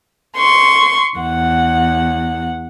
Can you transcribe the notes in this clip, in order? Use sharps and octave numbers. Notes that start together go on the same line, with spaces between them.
C6 C#6
E2 F#5